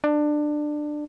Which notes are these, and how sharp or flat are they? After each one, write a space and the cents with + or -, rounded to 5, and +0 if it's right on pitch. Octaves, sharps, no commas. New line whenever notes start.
D4 +20